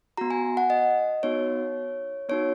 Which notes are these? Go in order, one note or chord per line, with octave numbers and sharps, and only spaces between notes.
B3 F#4 A#5
G#5
F#5
D#5
B3 D#4 F#4 C#5
B3 D#4 F#4 C#5